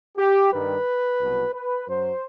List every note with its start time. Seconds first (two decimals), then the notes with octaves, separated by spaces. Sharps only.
0.16 G4
0.51 G2 D#3 G3 B4
1.19 C2 B2 F#3
1.53 B4
1.87 F#2 F#3 C5